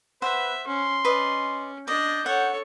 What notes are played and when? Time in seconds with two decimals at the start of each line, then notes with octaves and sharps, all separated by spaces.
0.22 B4 C5 E5 F#5
0.67 C#4 C6
1.05 C#4 B4 D5 D#5
1.88 D4 D5 D#5 G6
2.26 A4 C#5 F#5